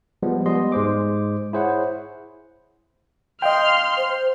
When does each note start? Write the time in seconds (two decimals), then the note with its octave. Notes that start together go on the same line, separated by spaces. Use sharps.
0.23 F3 G3 G#3 B3
0.46 G3 G#3 B3 G#4 D#5 C6
0.72 G#2 G#3 C5 D6
1.53 E4 G#4 C5 C#5 F#5
3.42 D#5 F5 G5 C6 F6
3.97 C5